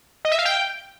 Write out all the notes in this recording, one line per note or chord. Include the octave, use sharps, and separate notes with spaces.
D#5
E5
F5
G5